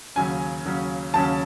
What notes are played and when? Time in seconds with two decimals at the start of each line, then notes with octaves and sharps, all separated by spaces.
0.16 D#2 C#3 F#3 C#4 G#5
0.65 D#2 C#3 F#3 C#4
1.14 D#2 C#3 F#3 C#4 A5